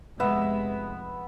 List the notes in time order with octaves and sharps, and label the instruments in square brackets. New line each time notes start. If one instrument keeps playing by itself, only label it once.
[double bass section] F1 G#3 [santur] B3 E5